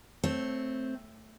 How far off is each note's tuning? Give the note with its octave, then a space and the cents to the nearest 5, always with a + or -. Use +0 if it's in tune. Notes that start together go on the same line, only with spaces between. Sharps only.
A3 +0 C4 +0 C#5 -15